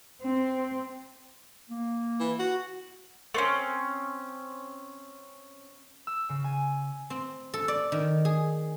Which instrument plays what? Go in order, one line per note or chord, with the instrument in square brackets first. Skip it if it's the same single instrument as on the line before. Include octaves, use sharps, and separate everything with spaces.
[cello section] C4
[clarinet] A#3
[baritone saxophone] E3
F#4
[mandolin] A3 C4 C#4
[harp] E6
C#3
G#5
[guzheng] C4
A4
D5
D#3
G#4